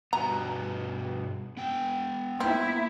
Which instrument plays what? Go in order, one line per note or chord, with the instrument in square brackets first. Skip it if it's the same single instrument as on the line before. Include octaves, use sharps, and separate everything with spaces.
[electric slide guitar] G2 B2 B3 [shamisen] A#5
[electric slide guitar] B3 G5
[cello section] A#3 E4 [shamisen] C4